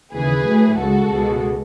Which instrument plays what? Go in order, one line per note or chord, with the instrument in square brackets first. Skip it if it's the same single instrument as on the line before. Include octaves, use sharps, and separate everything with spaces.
[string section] D#2 C#3 E3 G#4 B4
A2 F#3 A3
C#2 C#3 G#3 F#4 A4
C#2 B2 G#3